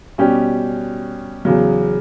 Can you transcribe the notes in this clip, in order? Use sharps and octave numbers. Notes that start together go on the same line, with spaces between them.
B2 G3 C#4 G4
E2 C#3 F#3